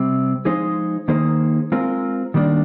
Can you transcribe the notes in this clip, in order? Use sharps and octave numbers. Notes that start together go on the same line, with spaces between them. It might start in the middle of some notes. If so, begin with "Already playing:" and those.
Already playing: C3 G3 C4
F3 G#3 D#4 G#4 C5
D#3 A#3 D#4 G#4 C5
G#3 C4 F4 A#4
D#3 G3 A#3 D4